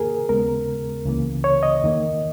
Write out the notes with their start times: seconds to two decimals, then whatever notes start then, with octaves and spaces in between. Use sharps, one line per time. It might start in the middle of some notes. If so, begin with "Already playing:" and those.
Already playing: E2 D#3 A#3 G#4 A#4
0.29 D#2 C#3 G#3 B3 A#4
1.05 C#2 C#3 E3 A#3
1.44 C#5
1.63 D#5
1.83 E2 D#3 A#3